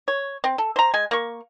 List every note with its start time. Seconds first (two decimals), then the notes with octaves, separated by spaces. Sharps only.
0.08 C#5
0.44 C4
0.58 A4
0.76 C5 A#5
0.94 G#3 G#5
1.11 A#3 C#6